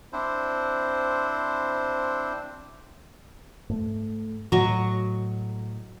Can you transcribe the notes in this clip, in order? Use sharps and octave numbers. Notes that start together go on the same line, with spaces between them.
C4 D4 E4 C5
G#2 A3
A2 F#3 D#5 C#6